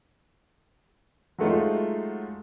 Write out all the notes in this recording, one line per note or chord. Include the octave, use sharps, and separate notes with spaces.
F#3 G#3 A3 D#4 F4